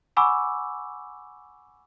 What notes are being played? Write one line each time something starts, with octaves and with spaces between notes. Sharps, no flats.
F#5 G#5 B5 C#6 D6 E6